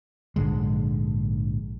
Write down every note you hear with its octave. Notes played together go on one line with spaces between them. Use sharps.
A#1 G#2 D3 G#3